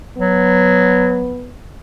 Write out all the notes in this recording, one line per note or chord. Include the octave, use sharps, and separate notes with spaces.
F#3 B3